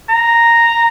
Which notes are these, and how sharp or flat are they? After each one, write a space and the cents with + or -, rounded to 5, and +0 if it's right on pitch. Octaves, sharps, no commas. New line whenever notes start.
A#5 -5